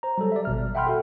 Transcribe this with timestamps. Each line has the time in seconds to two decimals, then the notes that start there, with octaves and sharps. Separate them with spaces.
0.03 C5 A#5
0.18 F#3 G3 A4
0.32 D5 E5
0.45 G#1 B2 F6
0.75 E5 F#5 G5 B5 C6 F6
0.87 F#4 A4